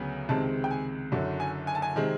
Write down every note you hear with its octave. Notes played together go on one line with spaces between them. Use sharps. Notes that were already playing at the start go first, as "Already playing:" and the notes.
Already playing: D2 C#3 F#3 B3
C#2 C3 D#3 G#3 C4 A5
G5
G#5
F#1 F#2 D3 F#3
G#5
G#5
A5
G#5
C3 D#3 G#3 C4